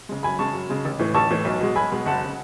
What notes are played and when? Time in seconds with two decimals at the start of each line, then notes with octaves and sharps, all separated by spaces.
0.09 C#3 G#3
0.23 F#2 G#5 B5
0.39 C#3 G#3 A5 C#6
0.54 F#2
0.69 C#3 G#3
0.85 A1
0.99 A2 E3
1.14 A1 A5 C#6
1.30 A2 E3
1.45 B1
1.60 B2 G#3
1.75 B1 G#5 B5
1.92 B2 G#3
2.06 F#1 F#5 A5
2.24 C#3